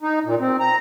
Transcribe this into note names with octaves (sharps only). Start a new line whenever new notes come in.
D#4
A#2
C4
A#5